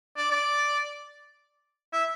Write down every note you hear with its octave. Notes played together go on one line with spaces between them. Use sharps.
D5
D5
E5